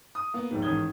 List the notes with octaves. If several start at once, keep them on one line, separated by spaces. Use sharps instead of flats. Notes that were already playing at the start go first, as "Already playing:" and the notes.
D#6
A#3 B3
A#1 D#2 G#2
A1 G#2 D#3 D#6 G#6 G7